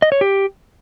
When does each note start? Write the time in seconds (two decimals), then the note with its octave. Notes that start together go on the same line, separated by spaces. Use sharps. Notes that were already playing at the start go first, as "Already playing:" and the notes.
0.02 D#5
0.12 C#5
0.21 G4